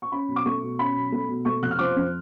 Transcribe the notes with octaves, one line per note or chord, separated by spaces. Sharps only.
C#6
C#4 B5
B1
D6
A3 C#6
B2
C#4 B5
B1
A3
B2
A3 C#6
F1 F#6
F6
F3 D6
F2